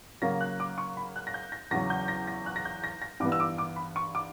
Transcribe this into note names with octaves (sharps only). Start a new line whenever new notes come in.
C#3 F#3 A#3 A#6
F#6
D6
C#6
B5
F#6
A#6
G6
A#6
E2 C#3 F#3 A#6
G6
A#6
A#6
F#6
A#6
G6
A#6
A#6
G2 E3 B3 D6
E6
D6
D6
B5
C#6
D6